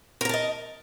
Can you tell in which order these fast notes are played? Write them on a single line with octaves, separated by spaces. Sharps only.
A#4 A#5 A5 D#5